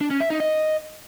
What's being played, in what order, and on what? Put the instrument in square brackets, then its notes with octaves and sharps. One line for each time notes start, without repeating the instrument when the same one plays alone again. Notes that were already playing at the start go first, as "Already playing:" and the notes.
[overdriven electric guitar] D4
C#4
E5
D#4
D#5